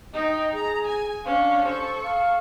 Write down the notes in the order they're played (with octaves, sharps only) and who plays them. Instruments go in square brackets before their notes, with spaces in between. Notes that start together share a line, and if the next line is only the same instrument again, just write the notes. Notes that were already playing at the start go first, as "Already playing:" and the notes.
[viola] D#4 G5 [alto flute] D#5
[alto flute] G#4 [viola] A#5
[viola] G#5
[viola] C#4 D4 [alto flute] F5
[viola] A4 C#6 [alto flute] C5
[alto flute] F5